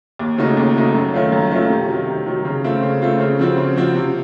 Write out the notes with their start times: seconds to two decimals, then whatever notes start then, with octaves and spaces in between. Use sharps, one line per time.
0.19 D#2
0.38 C#3 A3 D#4 F#4
0.57 D#2
0.75 C#3 A3 D#4 F#4
0.94 F#2
1.14 D#3 A3 C#4 F4
1.32 F#2
1.51 D#3 A3 C#4 F4
1.70 C3
1.89 D#3 F#3
2.07 C3
2.26 D#3 F#3
2.45 C#3
2.64 A3 C4 F4
2.83 C#3
3.02 A3 C4 F4
3.20 C#3
3.39 F3 C4 F#4
3.57 C#3
3.76 F3 C4 F#4
3.95 C3